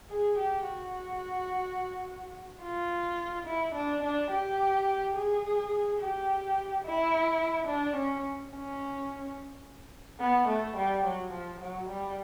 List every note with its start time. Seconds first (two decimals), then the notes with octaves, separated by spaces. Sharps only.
0.10 G#4
0.38 G4
0.67 F#4
2.62 F4
3.47 E4
3.75 D4
4.03 D4
4.31 G4
5.15 G#4
6.00 G4
6.84 E4
7.68 D4
7.96 C#4
8.52 C#4
10.20 B3
10.48 A3
10.77 G3
11.05 F#3
11.32 F3
11.61 F#3
11.89 G3